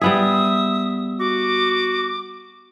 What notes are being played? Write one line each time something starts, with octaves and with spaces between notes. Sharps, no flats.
G3 B3 G#4 E5 D#6
F#4 D6